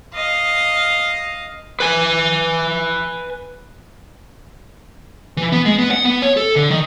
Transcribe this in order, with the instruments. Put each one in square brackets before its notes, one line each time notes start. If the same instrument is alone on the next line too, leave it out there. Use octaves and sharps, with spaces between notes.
[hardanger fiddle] D#5 F5
[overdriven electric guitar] B4 G#5
[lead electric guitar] E3
B3
G#3
B3
F#5
B3
C#5
A4
D3
D#3